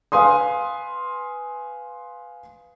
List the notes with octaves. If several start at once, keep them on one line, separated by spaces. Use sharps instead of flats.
B4 F5 G#5 C6 D#6